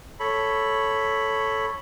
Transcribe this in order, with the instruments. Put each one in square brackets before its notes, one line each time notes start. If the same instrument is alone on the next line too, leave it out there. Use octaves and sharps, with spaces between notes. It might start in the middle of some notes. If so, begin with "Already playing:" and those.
[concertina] A4 C#5 B5